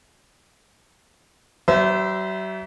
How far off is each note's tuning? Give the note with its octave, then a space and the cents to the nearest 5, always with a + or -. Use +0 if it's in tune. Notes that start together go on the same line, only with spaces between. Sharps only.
F#3 +45 C5 -35 E5 +0